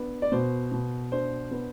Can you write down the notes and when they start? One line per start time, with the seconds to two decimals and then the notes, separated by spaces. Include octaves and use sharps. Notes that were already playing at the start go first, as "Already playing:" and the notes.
Already playing: B3 D4
0.22 D5
0.32 B2 C5
0.72 B2
1.12 D4 C5
1.51 B3